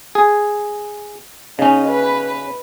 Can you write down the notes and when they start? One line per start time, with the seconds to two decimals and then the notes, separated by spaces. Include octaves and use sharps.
0.15 G#4
1.59 C#3 C#4 D#4
1.88 B4